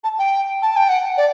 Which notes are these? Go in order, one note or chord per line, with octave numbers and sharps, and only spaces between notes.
A5
G5
A5
G5
F#5
D5